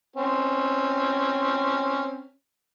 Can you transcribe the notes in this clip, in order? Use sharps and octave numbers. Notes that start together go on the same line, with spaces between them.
C4 C#4